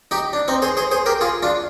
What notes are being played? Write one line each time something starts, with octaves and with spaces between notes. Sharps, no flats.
D#4 G4
D4
C4 D#4
G#4 C5
G#4 C5
G#4 C5
G4 A#4
F4 G#4
D4 F4